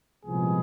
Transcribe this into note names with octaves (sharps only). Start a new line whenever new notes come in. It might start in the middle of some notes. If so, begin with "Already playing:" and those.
C2 A#2 F3 G#3 B3 G#4